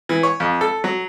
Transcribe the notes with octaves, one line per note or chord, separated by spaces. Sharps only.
E3
C#5
F2
A4
F#3